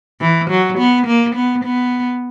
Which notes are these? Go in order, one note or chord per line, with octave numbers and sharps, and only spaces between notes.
E3
F#3
B3
A#3
B3
B3